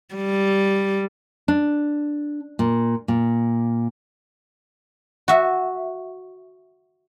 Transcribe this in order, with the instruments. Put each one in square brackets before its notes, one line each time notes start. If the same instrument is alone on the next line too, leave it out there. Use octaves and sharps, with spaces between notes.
[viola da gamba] G3
[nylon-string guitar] D4
A#2
A#2
[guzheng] F#4 E5